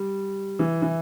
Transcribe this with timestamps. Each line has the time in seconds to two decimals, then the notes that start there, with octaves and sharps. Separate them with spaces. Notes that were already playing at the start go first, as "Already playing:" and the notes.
Already playing: G3
0.59 E3
0.82 E3